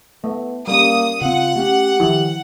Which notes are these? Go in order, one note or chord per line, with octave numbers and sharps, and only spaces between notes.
A3 B3
G3 A#3 C#4 D#6
C#3 C4 F4 F#5
A3 C#4 G4
D#3 F3 E4